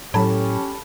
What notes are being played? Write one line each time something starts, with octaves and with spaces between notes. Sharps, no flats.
A2 F#3 C#4 G4 A4 A5 B5